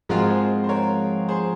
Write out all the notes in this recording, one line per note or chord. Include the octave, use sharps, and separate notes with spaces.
G#2 F3 G#3 C4 F4 F#4 A#4
G#4 C5
C5
A#4 C#5
G#4 C5